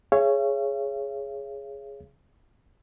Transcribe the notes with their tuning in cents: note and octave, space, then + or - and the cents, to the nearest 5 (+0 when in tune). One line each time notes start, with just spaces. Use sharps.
G#4 +0 C#5 +0 F5 -45